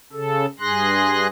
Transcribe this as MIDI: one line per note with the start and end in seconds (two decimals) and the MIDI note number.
0.13 0.46 49
0.13 0.46 69
0.60 1.27 43
0.60 1.27 68
0.60 1.27 84
0.60 1.27 90
0.60 1.27 94